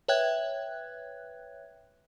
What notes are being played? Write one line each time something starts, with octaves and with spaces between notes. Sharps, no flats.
B4 C#5 E5 G5 F#6 G#6